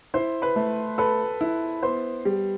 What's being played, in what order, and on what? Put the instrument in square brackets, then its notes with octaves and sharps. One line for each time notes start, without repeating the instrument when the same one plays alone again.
[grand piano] E4 [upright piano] C5 C6
[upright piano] B4 B5
[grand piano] A3
[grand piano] A4 [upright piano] B4 B5
[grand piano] E4
[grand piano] B3 [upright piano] C5 C6
[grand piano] G3